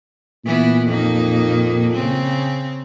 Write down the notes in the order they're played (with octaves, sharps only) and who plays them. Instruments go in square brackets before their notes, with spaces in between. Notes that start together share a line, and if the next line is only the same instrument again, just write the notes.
[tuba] A#2 [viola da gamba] E3 B3 E4
[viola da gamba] F2 A#3 D#4
C#3 C4